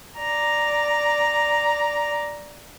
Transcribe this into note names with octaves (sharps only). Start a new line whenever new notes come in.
D5 A#5